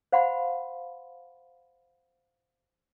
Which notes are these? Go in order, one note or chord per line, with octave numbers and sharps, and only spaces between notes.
C5 F5 F#5 B5 C6